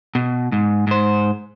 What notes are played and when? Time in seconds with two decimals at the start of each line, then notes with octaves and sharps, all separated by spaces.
0.15 B2
0.52 G#2
0.87 G#2 C5